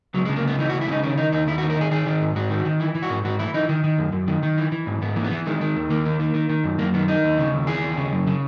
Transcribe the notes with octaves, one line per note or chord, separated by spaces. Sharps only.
C#2 F#3
G#3
C#3
A#3
C#2 B3
E3 D#4
F#4
C#2
E4
C#3 D#4
D#3 C#4
D#3 D#4
D#2 D#4
D#2 E4
F#4
D#3
A#4
D#3 G#4
D#3 G#4
D#3
G#2
G#2 F#4
D#3
D#3
E3
E3
F#4
G#2
G#2 F#4
E3 E4
E3 D#4
D#3
D#3
F#2
F#2
D#3
D#3
E3
E3
G#2
G#2 B3
E3 A#3
B3
E3
D#3 G#3
D#3
D#2
D#2 A#3
D#3
D#3
D#3
D#3
F#2
F#2 A#3
D#3 B3
D#3 D#4
D#2
C#3
D#2
E3 G#4
D#2
C#3
F#2
C#3